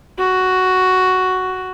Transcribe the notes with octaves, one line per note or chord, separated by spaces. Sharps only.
F#4